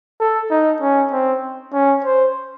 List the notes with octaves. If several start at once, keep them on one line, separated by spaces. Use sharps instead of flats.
A4
D#4
C#4
C4
C#4
C5